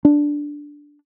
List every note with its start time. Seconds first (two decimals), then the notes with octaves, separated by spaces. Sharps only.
0.05 D4